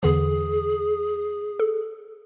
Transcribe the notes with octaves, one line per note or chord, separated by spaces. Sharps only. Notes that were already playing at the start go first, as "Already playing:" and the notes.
E2 D3 E3 G#4
A4